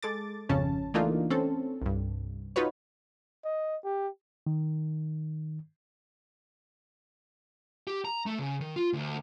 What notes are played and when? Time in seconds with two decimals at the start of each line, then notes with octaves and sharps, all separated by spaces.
0.03 G#3 A4 D6 A6
0.49 G#1 F2 C#3 C#4 A5
0.94 E3 A3 A#3 D4 D#4 F4
1.30 C4 C#4 A4
1.82 C2 G2
2.56 D#4 F4 F#4 B4 C#5
3.45 D#5
3.84 G4
4.47 D#3
7.87 G4
8.05 A#5
8.26 A3
8.39 C#3
8.61 D#3
8.76 F4
8.93 D2